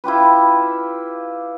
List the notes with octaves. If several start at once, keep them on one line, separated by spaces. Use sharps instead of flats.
E4 F4 G4 B4